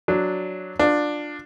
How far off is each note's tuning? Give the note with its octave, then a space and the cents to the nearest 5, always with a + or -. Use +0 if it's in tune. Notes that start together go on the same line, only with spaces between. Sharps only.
F#3 +0 D4 +0
D4 +10 F4 +20